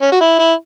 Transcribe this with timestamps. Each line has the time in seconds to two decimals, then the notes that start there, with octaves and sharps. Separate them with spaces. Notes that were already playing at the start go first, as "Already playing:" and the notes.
0.01 C#4
0.12 F#4
0.21 E4
0.39 E4